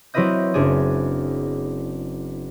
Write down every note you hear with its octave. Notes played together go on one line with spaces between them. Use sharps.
F#3 C4 E4 B4 D#5 G6
F#1 D4 G#4